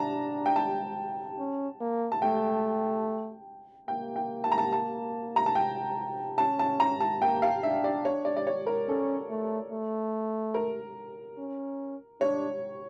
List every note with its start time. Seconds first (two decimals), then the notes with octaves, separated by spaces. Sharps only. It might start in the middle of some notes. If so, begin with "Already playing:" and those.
Already playing: D4 A5 A#5
0.46 G5
0.56 A5
1.39 C#4
1.81 A#3
2.12 A5
2.22 A3 G5
3.88 A#3 G5
4.16 G5
4.44 A5
4.52 A#5
4.58 A5
4.72 A5
5.36 A#5
5.46 A5
5.55 G5
6.38 C#4 A5
6.59 A5
6.80 A#5
7.00 A5
7.22 A#3 G5
7.42 F5
7.63 D4 E5
7.84 D5
8.05 C#5
8.25 D5
8.37 D5
8.47 C#5
8.67 A#4
8.88 C#4 A4
9.30 A3
9.72 A3
10.54 A#4
11.38 C#4
12.21 D4 C#5